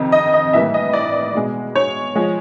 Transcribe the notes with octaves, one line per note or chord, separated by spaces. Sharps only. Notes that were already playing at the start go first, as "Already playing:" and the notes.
Already playing: F2 C3 D#3
D#5
D#5
A2 E3 G3 A#3 E5
D#5
D5
B2 G#3
C#5
F3 G#3